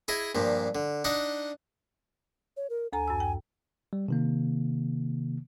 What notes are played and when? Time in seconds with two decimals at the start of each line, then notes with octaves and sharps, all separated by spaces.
0.08 E4 G#4 D#5
0.35 G2 A#2 F3
0.75 D3
1.04 D4 D#4 D#5 F#5
2.57 C#5
2.70 A#4
2.93 D2 A4 G#5 A#5
3.08 F#2 A5 E6
3.20 G5
3.93 G3
4.08 C3 D#3 A#3